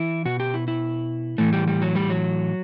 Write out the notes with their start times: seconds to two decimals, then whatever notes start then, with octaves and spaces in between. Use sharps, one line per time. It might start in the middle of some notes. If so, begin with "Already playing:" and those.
Already playing: E3 E4
0.25 B2 F#4
0.40 G4
0.54 E4
0.68 E4
1.38 A2 E3 A3
1.53 G3
1.68 G3
1.82 F#3
1.96 G3
2.10 F#3